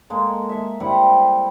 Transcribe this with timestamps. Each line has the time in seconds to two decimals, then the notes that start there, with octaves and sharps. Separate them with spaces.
0.10 G#3 A#3 A4
0.49 A4 E5
0.80 G3 C4 E4 F#5